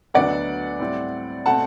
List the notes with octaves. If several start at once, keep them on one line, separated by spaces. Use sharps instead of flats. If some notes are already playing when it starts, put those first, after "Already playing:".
D2 D3 F#3 B3 D5 F#5
A2 G3 C4
B2 A3 C4 F#5 A5